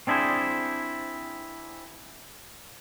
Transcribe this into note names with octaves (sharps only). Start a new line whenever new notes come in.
C4 D4 E4 G#4 C5